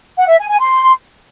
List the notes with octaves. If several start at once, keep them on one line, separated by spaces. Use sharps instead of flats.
F#5
E5
G#5
G#5
C6